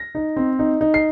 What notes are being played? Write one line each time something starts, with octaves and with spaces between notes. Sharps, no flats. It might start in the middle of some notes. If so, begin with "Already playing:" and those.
Already playing: A#6
D#4
C4
D#4
D#4
C7